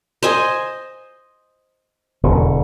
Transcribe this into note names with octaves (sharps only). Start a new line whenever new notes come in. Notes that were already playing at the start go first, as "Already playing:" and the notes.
C5 D#5 G#5
E1 D3